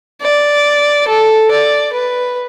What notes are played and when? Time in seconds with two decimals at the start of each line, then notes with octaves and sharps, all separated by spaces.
0.21 D5
1.08 A4
1.51 D5
1.93 B4